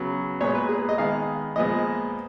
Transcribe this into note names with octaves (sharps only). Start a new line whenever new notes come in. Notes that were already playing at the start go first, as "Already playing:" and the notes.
Already playing: C#3 F#3 B3
A#2 G#3 B3 C#5
B4
G#4
D#5
D#3 G#3 B3 F5
A#2 F3 G#3 B3 D#5